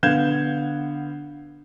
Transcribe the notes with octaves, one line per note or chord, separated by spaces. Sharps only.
D3 B3 F5 G6 G#6 E7